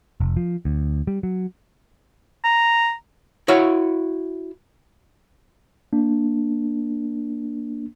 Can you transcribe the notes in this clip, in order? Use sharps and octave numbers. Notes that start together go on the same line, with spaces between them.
F1
F3
D2
G3
F#3
A#5
E4 F#4 C#5 F5
A#3 D4